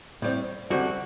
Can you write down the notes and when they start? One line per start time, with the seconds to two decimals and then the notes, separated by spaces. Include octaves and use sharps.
0.22 A2 G3 C4
0.70 F#2 D3 G3 C4 F#4